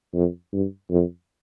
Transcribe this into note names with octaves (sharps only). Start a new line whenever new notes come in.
F2
G2
F2